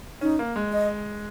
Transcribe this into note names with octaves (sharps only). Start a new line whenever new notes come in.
C#4 D#4
A#3
G#3
D#5